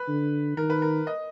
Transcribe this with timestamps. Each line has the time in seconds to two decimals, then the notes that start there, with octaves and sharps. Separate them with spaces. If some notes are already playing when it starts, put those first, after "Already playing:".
Already playing: B4
0.08 D3
0.57 D#3 A#4
0.70 B4
0.82 A#4
1.07 D#5